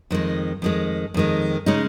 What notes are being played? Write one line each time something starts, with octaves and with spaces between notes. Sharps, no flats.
F2 D#3 G#3
F2 D#3 G#3
F2 D#3 G#3
C#3 G#3 C#4 D#4